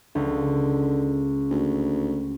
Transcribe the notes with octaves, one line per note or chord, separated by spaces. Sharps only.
C#2 D3
D2